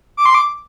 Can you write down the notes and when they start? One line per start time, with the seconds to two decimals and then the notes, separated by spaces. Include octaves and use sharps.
0.17 D6
0.26 C6
0.35 D6